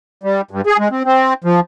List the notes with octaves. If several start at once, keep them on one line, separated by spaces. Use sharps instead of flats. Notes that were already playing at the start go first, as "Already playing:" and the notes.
G3
G2
G#4
G#3
C4
C4
F3